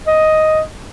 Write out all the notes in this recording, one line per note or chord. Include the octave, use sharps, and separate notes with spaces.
D#5